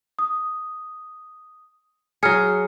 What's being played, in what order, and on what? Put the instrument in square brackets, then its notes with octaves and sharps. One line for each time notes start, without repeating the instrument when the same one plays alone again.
[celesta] D#6
[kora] F#3 G#4 [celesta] F6 C#7